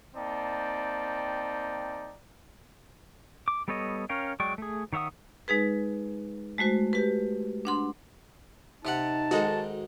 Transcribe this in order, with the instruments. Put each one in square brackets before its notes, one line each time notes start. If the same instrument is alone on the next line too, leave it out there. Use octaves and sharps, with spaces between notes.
[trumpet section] A#3 C4 D#4 D5 G5 A5
[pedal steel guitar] D6
G3 B3 A4 C#5 D#5
C#4 A#4 C#5 F5 G5
F#3 G#3 D5 G5 C#6
A3 G#4
D#3 C#5 E5 F#5 D#6
[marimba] G#3 D#4 G#4 B4
G#3 A3 F#4 C5
G4 B4
D4 F#5 C6
[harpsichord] C3 G4 F#5 [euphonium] D#4 [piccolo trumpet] A5
[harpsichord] G#2 D#3 G#3 [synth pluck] F#4 A4